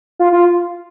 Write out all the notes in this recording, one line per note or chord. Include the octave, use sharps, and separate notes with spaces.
F4
F4